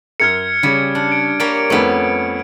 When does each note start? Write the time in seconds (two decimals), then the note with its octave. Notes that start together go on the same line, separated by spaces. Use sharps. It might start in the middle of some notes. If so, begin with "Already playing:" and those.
0.20 F#2 A#4 F6 G#6 C#7
0.63 C#3 G3 C#4
0.95 D4
1.12 D7
1.40 G3 A#3 C#5 D7
1.70 F2 A3 B3 C#4